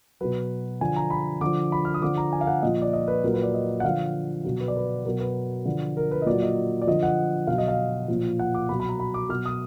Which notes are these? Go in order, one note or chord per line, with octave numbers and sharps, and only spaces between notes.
B2 F#3 B4
D3 F3 G#5
A#5
B5
D3 F3 D6
B5
F6
D#6
D3 F3 D6
A#5
G#5
F5
F#5
A#2 F3 D#5
D5
D#5
B4
A#2 F#3 A#4
B4
D5
D#5
F#5
D3 F3 F5
B2 F#3
B4
D5
B4
B2 F#3 A#4
B4
D3 F3
A#4
B4
D#5
A#2 F#3 D5
D#5
D5
D3 F3 D#5
F#5
B2 F5
F#3
D#5
F5
A#2 F3
F#5
D6
B2 F#3 B5
B5
A#5
B5
D6
B2 F#3 F6
D#6